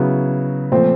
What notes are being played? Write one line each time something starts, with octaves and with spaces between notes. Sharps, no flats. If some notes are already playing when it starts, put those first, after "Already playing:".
Already playing: C#3 F#3 B3 E4
A#2 F3 A3 C4